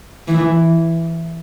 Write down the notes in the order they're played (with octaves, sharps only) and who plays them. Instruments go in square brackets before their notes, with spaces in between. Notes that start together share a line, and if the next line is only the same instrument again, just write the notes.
[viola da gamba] E3